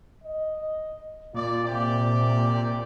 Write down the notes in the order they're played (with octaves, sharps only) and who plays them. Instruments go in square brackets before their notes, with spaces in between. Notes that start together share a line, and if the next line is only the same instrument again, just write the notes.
[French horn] D#5
[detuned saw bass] A#2 [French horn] F4 [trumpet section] D5
[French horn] C3 [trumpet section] G4 D5